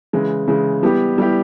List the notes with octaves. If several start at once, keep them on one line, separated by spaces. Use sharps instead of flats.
C#3 E3 G#3
C#3 E3 G#3
G3 B3 E4 G4
G3 B3 E4 G4